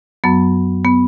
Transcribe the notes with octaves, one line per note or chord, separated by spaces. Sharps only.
F#2 F#3 B3
B3